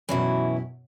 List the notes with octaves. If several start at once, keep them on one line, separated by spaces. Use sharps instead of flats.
F#2 B2 E3 F#3 E4